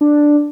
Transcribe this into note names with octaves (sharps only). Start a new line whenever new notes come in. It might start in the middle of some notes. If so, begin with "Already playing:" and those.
D4